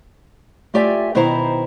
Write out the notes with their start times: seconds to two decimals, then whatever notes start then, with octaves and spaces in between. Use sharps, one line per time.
0.74 A3 F4 G4 D5 E5 G#5
1.15 B2 D#3 C4 E4 C5 A#5